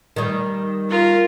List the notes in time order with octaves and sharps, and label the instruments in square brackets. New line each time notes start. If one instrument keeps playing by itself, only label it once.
[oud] D#3 G3
[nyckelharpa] F4 A#4